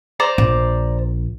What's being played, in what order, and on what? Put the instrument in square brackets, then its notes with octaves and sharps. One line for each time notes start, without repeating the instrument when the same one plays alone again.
[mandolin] C5 D5 A#5
[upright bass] A#1